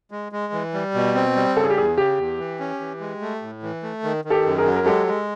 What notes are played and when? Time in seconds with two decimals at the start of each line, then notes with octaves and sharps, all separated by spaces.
0.11 G#3
0.32 G#3
0.53 E3
0.74 G3
0.94 B2
1.15 C4
1.35 G3
1.56 C#3 A4
1.63 G#4
1.70 G4
1.77 E2 G#4
1.97 C#3 G4
2.18 E2
2.39 E3
2.60 C#4
2.80 E3
3.00 G#3
3.21 A3
3.42 A2
3.63 E3
3.83 A3
4.03 D#3
4.25 D#3
4.30 G4 A4
4.45 F#2
4.58 G#4 A#4
4.66 F#3
4.76 A#4
4.86 G#3 G4 A4
5.07 G#3